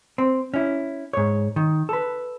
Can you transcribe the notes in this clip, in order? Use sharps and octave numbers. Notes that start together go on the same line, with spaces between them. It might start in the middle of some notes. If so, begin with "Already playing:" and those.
C4
C#4 E4
G#2 C#5
D#3
A4 B4